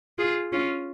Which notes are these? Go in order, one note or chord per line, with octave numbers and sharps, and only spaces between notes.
F4 G#4
C#4 F4